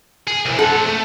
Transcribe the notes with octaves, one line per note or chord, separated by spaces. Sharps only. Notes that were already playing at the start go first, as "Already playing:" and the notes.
G#4
C2 E3
C4 A4 F#5
A3